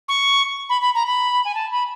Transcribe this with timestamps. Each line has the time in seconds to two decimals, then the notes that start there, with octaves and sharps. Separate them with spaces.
0.08 C#6
0.69 B5
0.81 B5
0.95 A#5
1.07 B5
1.45 G#5
1.55 A5
1.71 B5